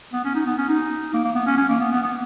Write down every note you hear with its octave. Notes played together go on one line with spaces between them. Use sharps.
B3
C#4
D#4
B3
C#4
D#4
A#3
A#3
B3
C#4
C#4
A#3
B3
B3
B3